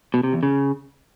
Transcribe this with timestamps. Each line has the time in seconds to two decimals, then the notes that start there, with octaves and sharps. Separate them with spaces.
0.14 B2
0.23 C3
0.33 E2
0.43 C#3